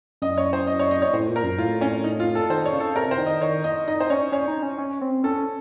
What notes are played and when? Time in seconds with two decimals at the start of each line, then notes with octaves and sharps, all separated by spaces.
0.22 F#2 D#5
0.38 C#5
0.53 C5
0.67 D#5
0.80 C#5
0.91 D#5
1.02 C#5
1.13 A2 C5
1.28 A#2
1.36 A#4
1.43 F#2
1.58 A2 F4
1.81 C#4
2.04 D#4
2.20 F4
2.35 A4
2.50 D#3 C5
2.66 C#5
2.73 C#3
2.80 A4
2.95 C3 A#4
3.11 C5
3.18 D#3
3.26 D#5
3.41 D#3 C#5
3.64 D#5
3.88 D#4 D#5
4.00 C5
4.10 C#4 C#5
4.32 C#4 C#5
4.48 D#4
4.63 C#4
4.78 C#4
5.01 C4
5.24 C#4 A4